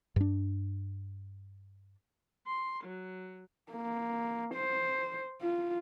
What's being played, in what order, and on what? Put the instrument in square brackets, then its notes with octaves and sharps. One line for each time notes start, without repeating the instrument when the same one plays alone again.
[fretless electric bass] G2 D4
[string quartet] C6
F#3
[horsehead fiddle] A#3
C5
F4